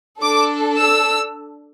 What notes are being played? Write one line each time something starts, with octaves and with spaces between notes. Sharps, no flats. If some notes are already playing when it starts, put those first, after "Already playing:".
D4 A4 D6
E6